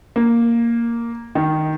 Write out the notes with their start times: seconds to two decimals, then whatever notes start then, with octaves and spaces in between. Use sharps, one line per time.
0.16 A#3
1.35 D#3